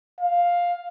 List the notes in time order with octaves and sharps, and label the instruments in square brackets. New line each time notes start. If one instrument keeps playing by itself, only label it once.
[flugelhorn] F5